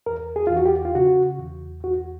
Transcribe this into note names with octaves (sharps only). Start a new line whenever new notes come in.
E2 A#4
G#4
E2 F4
F#4
G4
F4
C#3 F#4
E2
E2 F#4